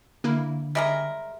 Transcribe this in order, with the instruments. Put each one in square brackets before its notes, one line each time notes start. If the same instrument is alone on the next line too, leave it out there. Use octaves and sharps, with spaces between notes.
[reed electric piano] D3 [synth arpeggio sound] A#3 E4 A#4
[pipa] G3 G#3 A#4 [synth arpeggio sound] D#5 [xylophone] E5